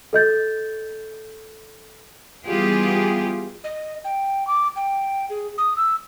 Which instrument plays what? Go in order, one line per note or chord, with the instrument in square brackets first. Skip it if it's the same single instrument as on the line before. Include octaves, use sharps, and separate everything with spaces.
[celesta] A4 D#5 G6 A6
[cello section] E3 G3 B3 F4 G4 G#4
[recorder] D#5
G5
D6
G5
G#4
D#6
E6